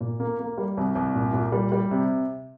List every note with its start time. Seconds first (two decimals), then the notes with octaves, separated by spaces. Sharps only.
0.01 A#2
0.20 A#3
0.39 A#3
0.58 G3
0.77 C2
0.95 C2
1.15 A#2
1.33 A#2
1.52 G3
1.72 G3
1.91 C3